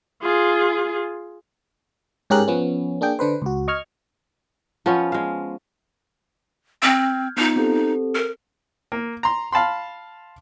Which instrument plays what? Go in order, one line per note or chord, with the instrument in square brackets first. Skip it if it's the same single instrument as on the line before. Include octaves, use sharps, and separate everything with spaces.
[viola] F4 G#4
[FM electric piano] G#2 C#4 G4 G#4 A#4 F#6
F3 B3 C#4
A#3 D4 G#4 G5
D3 D4 B4 C5
C#2 F#4
D#5 C#6 F6 G#6
[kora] F3 B3 C#4
G#3 F5
[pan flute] C4 [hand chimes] F6 G6 G#6
[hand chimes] B3 F4 [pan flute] D#4
[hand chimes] C4 G4 A4
[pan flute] A#4
[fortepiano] A#3
A#5 C6
F5 A5 B5 C6